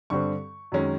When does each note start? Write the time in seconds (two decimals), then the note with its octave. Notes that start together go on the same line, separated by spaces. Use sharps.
0.10 G2 D3 G3 C4 C#6
0.72 F#2 D#3 G#3 C#4